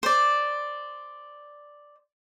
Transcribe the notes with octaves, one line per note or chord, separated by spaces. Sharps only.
C5 D5